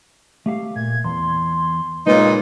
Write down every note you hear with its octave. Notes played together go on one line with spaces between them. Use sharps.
A3 G4 F5
A#2 G#6
E2 C6
A#2 C#3 G#3 A#3 D#4 B4 C#5